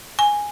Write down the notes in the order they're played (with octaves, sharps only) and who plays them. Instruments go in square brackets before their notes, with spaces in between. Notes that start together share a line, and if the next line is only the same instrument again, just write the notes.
[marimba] G#5